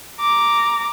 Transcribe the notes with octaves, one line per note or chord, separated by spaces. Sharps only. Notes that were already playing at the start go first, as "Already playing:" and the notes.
A#5 D6